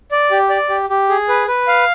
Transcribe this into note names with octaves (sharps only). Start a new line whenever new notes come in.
D5
G4
D5
G4
G4
G#4
B4
B4
F5